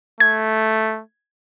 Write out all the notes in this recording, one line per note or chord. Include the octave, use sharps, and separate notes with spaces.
A3 G#6